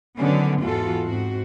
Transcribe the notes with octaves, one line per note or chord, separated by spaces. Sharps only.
D3 D#3 F#3 B3 C#4
E2 G#2 E3 F4 F#4 A4
G#2 C4 F#4